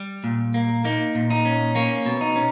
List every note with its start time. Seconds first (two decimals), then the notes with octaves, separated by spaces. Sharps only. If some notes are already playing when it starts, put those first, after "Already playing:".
Already playing: G3
0.24 A#2
0.54 A#3
0.84 A#3 D#4
1.15 A#2
1.30 D#4
1.45 C#4
1.75 A#3 C#4
2.06 B2
2.21 D#4
2.36 C#4